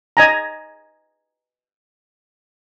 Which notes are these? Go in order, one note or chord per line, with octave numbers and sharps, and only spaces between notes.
D#5 G#5 A#5